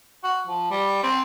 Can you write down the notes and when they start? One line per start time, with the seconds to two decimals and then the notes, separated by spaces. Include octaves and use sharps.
0.24 F#4
0.47 F3
0.71 G3
1.03 C4